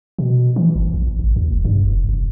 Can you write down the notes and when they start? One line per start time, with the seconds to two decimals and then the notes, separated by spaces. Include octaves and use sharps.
0.19 B2
0.56 E3
0.75 G1
0.94 A#1
1.19 G#1
1.36 D#2
1.52 F1
1.65 G2
1.84 F1
2.09 F1